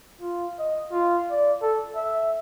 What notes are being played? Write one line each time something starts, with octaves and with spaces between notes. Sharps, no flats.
F4
D#5
F4
D5
A4
E5